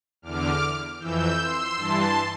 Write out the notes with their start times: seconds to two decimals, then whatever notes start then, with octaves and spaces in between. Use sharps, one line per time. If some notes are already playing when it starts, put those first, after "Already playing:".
0.22 E2 D3 D6 F6
0.99 F2 E3 E6 G6
1.39 C6 E6
1.76 G2 E3 A5 C6